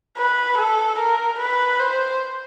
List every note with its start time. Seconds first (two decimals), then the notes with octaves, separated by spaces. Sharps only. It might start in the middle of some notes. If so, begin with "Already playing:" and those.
0.18 B4
0.58 A4
0.99 A#4
1.39 B4
1.79 C5